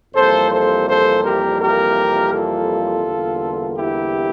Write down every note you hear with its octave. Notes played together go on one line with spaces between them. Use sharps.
F2 C3 E3 G3 A#3 A4 C5
A4 C5
A4 C5
G4 A#4
G4 A#4
F4 A4
E2 D3 G3 A#3
E4 G4